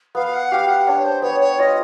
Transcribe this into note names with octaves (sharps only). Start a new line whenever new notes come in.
B3 F5
F#5
G4 F5
F#5
D4 C#5
C5
B3 C#5
C#5
F4 D#5